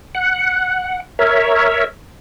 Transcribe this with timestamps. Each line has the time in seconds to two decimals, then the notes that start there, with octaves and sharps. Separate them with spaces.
0.15 F#5
1.19 A#4 C#5 E5